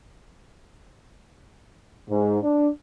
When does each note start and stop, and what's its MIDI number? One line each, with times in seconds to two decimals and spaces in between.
2.09 2.38 44
2.43 2.68 62